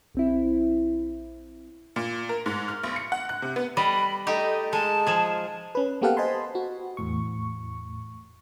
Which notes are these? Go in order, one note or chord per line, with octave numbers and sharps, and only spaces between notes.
A#1 C4 E4
A#2
A#4
G#2
F6
B1
C#7
F#5
F#6
C3
B3
G3 D5 D#5 B5
A3 D#4 G4 D#5
G#3 A5
F3 G#4
C#4 B4
A#3 B3 G4 A4 F5 F#5
C5 D#5 G#5 A5 B5 C6
F#4
E2 A2 C#6